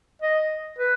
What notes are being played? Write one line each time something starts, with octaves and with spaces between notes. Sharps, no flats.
D#5
B4